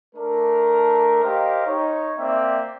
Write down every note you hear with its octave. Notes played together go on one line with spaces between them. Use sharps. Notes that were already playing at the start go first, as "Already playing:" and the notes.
A3 D4 A#4
G4 A#4 C5 D#5 F5
D#4 C#5
A#3 C4 D5 E5